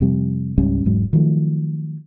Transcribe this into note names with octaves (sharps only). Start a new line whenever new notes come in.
F2 C3 G3
C#2 G#2 G3 C#4
E1 G#2 F#3
D#3 F3 F#3 A3